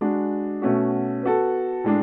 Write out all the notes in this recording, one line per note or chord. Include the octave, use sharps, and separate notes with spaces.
G#3 D4 F#4
B2 A3 C#4 F#4
B3 F#4 A4
A2 G#3 D4